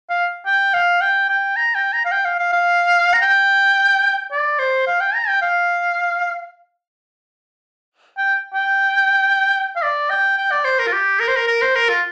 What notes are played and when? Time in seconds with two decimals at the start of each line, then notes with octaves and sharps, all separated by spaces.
0.10 F5
0.46 G5
0.74 F5
1.01 G5
1.29 G5
1.56 A#5
1.75 G5
1.93 A#5
2.05 F5
2.12 G5
2.25 F5
2.39 F5
2.53 F5
3.13 A#5
3.22 G5
4.32 D5
4.59 C5
4.87 F5
5.00 G5
5.15 A#5
5.28 G5
5.42 F5
8.18 G5
8.54 G5
9.76 F5
9.82 D5
10.10 G5
10.38 G5
10.51 D5
10.65 C5
10.79 A#4
10.87 F4
10.92 G4
11.20 A#4
11.28 C5
11.36 A#4
11.48 A#4
11.61 C5
11.75 A#4
11.89 F4